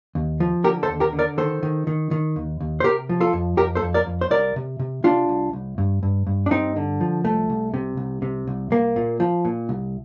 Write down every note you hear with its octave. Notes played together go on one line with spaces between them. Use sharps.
D#2
F3
D3 G4 A#4
A4 C5
D#2
G4 A#4
D3
A#4 D5
D#3 A4 C5
D#3
D#3
D#3
D#2
D#2
C5
C3 G4 A#4
F3
F4 A4
F2
F2 G4 A#4
A4 C5
F2
A#4 D5
F2
C5
C2 A#4 D5
C3
C3
C3 D4 F4
C2
C2
G2
G2
G2
D4
G2 C4 D#4
D3
F3
C2 A3
C2
C3
C2
C3
C2
C2 A#3
A#2
F3
A#2
C2